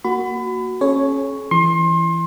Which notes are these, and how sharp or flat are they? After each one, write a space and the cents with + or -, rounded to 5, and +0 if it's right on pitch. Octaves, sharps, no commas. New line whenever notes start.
A#3 -5 F#4 +0 B5 +30
C#4 -20 G#4 +45 C#5 +0
E3 +15 C6 +30